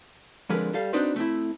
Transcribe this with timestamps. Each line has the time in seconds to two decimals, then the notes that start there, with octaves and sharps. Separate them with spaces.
0.49 F2 D3 F3 G#3 A#4 B4
0.74 G3 A4 F5
0.93 C4 D4 D#4 F#4 B4 C5
1.16 A3 C4 E4